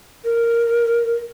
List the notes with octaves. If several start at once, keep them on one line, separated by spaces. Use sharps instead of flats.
A#4